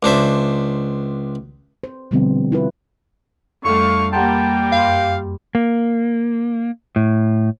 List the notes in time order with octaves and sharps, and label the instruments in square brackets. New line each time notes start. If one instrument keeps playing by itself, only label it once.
[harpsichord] C#2 D4 C5 E5
[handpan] C5
B2 D3 F3 G3 B3 C4
E4 F4 B4
[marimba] F2 G3 [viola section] D3 A3 F5 [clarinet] C#6
[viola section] G3 A#3 [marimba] F#5 A#5 C6 [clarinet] G5 [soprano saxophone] A5
[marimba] F#2 G4 C6 [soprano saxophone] F5
[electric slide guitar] A#3
A2